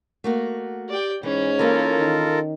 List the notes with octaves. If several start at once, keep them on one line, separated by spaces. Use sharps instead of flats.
A3 A#3 F#4
G4 D5 G5
G#2 E3 C#4
E3 A#3 D#4 F4 A4 A#4
D#3